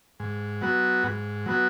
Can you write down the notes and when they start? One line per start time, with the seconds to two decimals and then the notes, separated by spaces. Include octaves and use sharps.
0.20 G#2
0.62 F#3 B3 F#4
1.03 G#2
1.46 F#3 B3 F#4